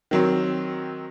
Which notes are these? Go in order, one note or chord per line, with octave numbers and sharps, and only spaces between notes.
D#3 F#3 C4